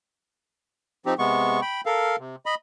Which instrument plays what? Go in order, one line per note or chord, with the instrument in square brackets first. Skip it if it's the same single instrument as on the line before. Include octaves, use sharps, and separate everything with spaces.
[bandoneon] F3 C4 D#4 G4
C3 G#3 B3 C#6
G5 B5
A4 A#4 F5
C3
D#5 B5